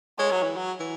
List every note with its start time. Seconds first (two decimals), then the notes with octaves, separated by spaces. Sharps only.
0.19 G#3 C#5
0.31 F#3
0.43 E3
0.56 F#3
0.80 E3